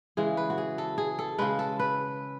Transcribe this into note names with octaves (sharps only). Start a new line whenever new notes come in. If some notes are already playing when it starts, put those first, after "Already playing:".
C#3 E3 G#3 G#4
B4
F#4
G#4
A4
G#4
A4
C#3 G#3 B4
A4
B4